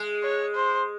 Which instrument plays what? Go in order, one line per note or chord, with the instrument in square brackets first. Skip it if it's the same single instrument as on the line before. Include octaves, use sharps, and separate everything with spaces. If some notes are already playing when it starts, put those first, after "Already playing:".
Already playing: [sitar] G#3
[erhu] C#5
C5